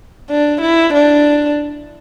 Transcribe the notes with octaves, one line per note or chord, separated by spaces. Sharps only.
D4
E4
D4